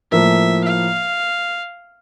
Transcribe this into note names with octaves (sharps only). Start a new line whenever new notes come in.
A2 F3 A#3 E5
F5